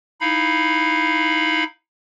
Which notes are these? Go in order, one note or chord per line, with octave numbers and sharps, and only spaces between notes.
D#4 E4 F5 B5